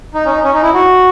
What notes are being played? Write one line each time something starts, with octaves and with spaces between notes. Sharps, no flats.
D#4
C#4
D#4
C#4
D#4
E4
F#4